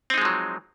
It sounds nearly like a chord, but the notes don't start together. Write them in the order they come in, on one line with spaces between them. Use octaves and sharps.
C4 D#4 G#3 F3 F#3